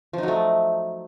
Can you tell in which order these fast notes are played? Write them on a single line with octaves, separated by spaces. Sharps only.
F3 D#4 F#3 A3